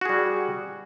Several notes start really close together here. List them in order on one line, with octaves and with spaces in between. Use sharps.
F#4 G#4 G3